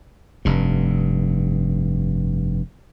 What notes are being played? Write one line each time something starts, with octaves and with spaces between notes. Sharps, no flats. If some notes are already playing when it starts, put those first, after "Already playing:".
F1 G2